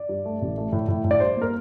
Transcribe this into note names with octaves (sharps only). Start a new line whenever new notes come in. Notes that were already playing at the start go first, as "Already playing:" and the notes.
Already playing: D5
G2
A3
A1
A3
A2
A2
A2
D5
G2 C5
A#3 A#4